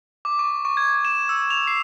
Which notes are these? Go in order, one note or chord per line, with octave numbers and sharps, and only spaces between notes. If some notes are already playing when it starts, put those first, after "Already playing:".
D6
C#6
C#6
G#6
E7
E6
F7
C7